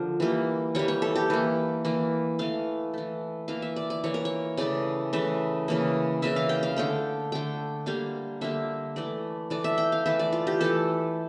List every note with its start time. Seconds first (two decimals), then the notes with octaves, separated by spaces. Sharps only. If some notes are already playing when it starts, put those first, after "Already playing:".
Already playing: D3 F3 A#4
0.20 E3 G3 A#3
0.75 E3 G3 A#3 C#5
0.88 C#5
1.02 A4
1.16 G4
1.30 E3 A#3
1.85 E3 A#3
2.39 E3 A3 F5
2.94 E3 A3
3.48 E3 A#3 F5
3.62 E5
3.76 D5
3.90 D5
4.04 E3 A#3 C#5
4.14 A#4
4.25 C#5
4.57 C#3 E3 A3 D5
5.13 C#3 E3 A3 E5
5.68 C#3 E3 A#3
6.22 C#3 E3 A#3 E5
6.36 F5
6.49 G5
6.63 F5
6.76 D3 A3 G5
7.32 D3 A3 G5
7.86 D3 G3 A#3 F5
8.41 D3 G3 A#3 E5
8.96 E3 A3 D5
9.50 E3 A3 D5
9.64 E5
9.78 G5
9.92 F5
10.06 E3 A3 E5
10.19 D5
10.33 F4
10.47 G4
10.61 E3 A3 A4